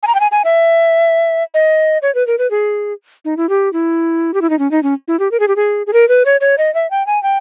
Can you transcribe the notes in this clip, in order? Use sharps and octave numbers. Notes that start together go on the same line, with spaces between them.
G#5
A#5
G5
G#5
G#5
E5
D#5
C#5
B4
A#4
B4
G#4
D#4
E4
G4
E4
G4
E4
D#4
C#4
D#4
C#4
E4
G4
A#4
G#4
G4
G#4
G#4
A#4
B4
C#5
C#5
D#5
E5
G5
G#5
G5